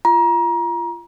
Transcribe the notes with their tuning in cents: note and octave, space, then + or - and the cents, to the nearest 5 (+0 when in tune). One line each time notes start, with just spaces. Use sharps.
F4 -25 A#5 +30